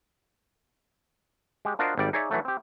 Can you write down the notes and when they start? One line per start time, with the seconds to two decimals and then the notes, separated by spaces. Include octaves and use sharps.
1.65 G#3 G4
1.79 D4 F4 F#4 A#4 C5 D#5
1.98 G#1 G3 D5 G5
2.13 D#4 G#4 C#5 D5 E5
2.31 E3 F#3 A3
2.45 C4 G4